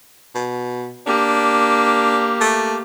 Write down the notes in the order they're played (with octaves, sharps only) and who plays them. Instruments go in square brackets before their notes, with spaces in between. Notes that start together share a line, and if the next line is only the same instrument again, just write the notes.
[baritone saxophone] B2
[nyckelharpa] A#3 G4 [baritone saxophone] D4
[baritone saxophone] A3